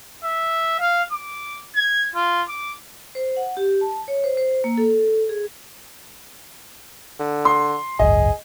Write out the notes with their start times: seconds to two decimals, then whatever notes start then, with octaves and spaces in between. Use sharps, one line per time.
0.24 E5
0.80 F5
1.12 D6
1.76 G#6
2.15 F4
2.49 D6
3.15 C5
3.37 F#5
3.57 G4
3.81 A5
4.08 C#5
4.24 C5
4.37 C5
4.64 A#3
4.78 A4
5.29 G#4
7.20 D3
7.45 C6
7.99 G#1 C#2 F#2 G#4 D#5